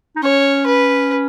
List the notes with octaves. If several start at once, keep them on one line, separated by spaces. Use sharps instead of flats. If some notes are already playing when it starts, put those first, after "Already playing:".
D#4
C#4 C#5
B4